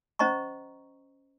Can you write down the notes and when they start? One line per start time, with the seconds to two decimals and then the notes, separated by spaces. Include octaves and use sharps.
0.19 C#4 C5 D#5 A#5 C#6